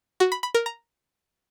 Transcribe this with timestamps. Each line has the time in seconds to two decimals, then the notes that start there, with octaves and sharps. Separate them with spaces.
0.20 F#4
0.32 B5
0.43 B5
0.55 A#4
0.66 A#5